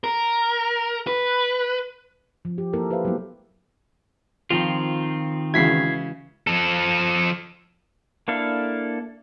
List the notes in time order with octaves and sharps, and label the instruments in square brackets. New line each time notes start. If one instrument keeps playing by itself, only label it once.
[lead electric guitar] A#4
B4
[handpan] F3
G4
A#3 E4 A4 A#4
G4 B4 C5 E5 F5
F#3 G#3 A#3 B3 E4
[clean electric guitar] D#3 C4 F4 [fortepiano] F3
[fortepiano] C#3 E4 [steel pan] E3 G#3 F#4 [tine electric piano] G#6 B6 C7
[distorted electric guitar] F3 A4
[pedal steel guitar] A#3 D4 E4 A4 F5